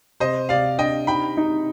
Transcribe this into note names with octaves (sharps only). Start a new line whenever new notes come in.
C3 C5 D#5
C3 D5 F5
D4 D#5 G5
D#4 G5 B5
D#4